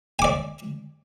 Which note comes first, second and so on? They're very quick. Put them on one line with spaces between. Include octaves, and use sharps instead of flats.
G#5 D6 D5